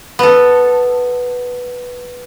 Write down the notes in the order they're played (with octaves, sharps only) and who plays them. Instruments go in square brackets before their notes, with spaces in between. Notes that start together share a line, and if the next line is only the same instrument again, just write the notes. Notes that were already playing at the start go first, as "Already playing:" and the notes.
[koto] B3 A4